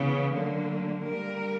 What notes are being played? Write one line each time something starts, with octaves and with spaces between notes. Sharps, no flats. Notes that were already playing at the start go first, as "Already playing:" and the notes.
Already playing: C#3 E3 B3
D3 F#3 A#3
D3 G3 A#3 A#4